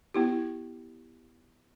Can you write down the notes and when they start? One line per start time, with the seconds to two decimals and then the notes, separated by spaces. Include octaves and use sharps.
0.14 B3 E4 G4